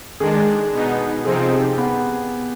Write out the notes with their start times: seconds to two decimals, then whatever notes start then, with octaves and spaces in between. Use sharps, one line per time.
0.20 D#3 G#3 D4 G#4
0.73 B2 B3 D#4
1.25 C3 F3 C4 D#4 G#4
1.51 G4
1.78 B3